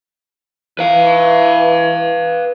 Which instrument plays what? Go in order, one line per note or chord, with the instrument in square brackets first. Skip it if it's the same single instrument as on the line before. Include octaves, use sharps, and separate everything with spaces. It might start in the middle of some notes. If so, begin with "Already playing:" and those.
[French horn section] E3 [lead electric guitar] B4 F5